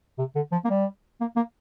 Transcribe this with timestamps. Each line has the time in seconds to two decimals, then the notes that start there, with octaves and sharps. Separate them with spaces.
0.18 C3
0.35 D3
0.52 F3
0.64 A#3
0.70 G3
1.20 A#3
1.36 A#3